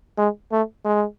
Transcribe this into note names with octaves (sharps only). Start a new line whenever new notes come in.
G#3
A3
G#3